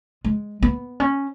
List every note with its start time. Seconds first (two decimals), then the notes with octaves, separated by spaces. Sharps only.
0.25 G#3
0.63 B3
1.00 C#4